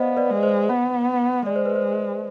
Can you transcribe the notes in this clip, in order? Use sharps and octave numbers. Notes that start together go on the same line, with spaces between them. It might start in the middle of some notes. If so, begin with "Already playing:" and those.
Already playing: B3 C5 D5 D#5 F5
B4 D5
G#3
C5
B3
G#3 D5
C5
B4
C5